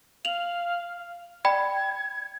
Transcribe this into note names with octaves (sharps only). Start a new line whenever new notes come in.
F5 F7 F#7
D5 G5 B5 G#6